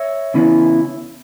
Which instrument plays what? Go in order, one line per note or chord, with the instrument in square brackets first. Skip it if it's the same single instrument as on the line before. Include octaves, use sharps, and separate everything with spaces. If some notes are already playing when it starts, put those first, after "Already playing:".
Already playing: [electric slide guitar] C#5 E5
C#3 E3 B3 E4